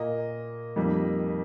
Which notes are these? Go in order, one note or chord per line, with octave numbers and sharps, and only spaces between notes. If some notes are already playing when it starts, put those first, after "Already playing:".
Already playing: A#2 A#3 D#5
F2 D#3 G3 A#3